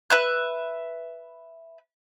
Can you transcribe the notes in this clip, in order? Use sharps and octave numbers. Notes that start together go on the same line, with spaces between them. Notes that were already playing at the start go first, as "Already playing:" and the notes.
B4 E5 F#6